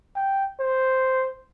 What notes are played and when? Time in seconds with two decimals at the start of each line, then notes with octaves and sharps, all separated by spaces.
0.16 G5
0.60 C5